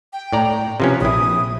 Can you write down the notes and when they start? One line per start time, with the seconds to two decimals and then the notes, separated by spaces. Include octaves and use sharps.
0.13 G5
0.33 A2 D5 A#5
0.80 C3 F3 C#4 B4
1.01 A#1 E4 D#6